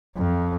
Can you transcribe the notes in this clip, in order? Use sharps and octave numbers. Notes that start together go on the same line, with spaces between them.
F2